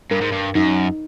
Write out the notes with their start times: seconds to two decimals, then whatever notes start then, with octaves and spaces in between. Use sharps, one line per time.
0.11 G2 A#4
0.21 G#2
0.32 G2
0.55 F#2 D#4